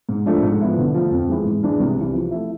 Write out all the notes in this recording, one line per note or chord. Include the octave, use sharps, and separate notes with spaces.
G#2
F3 A3 D4
G#2
F3 B3 E4
D3
F3 A3
F2
E3 G#3
G#2
E3 G#3 D4
C2
C3 E3
F3
A3 E4